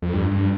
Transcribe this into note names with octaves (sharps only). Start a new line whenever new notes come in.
F2
G2
G2